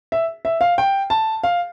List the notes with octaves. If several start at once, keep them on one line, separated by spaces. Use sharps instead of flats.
E5
E5
F5
G5
A5
F5